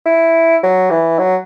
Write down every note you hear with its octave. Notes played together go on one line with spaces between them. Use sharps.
E4
F#3
E3
F#3